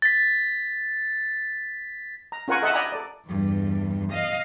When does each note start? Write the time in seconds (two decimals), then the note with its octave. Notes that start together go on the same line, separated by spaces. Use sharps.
0.02 A6 B6
2.32 A#5
2.48 C#4 F4 A#4 F#5 G#5 C#6
2.62 A4 D#5 E5 F#5 A5
2.74 D5 D#5 G5 G#5 A#5 B5
2.92 A4 D5
3.27 E2 G2
4.12 D#5 F5